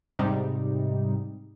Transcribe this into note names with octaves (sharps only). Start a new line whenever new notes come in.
G#2 C3 G3 D#4